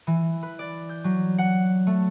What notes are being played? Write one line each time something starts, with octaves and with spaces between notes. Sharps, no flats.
E3
B4
D5
G6
F#3
F#5
A3